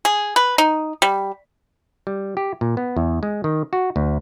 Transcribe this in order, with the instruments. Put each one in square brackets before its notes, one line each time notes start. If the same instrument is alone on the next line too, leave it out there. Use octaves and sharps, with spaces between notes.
[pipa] G#4
B4
D#4
G3
[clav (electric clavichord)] G3
G4
A#2
B3
E2
G#3
D#3
F#4
D2